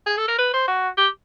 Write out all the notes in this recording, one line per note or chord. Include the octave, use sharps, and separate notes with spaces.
G#4
A4
A#4
B4
C5
F#4
G4